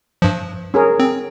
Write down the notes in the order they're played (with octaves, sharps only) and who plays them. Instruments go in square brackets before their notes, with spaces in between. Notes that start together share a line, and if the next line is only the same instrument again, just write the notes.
[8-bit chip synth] G2 F3
[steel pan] C#4 G#4 A#4
[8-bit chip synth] C4